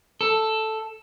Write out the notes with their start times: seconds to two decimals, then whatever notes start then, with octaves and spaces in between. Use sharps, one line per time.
0.21 A4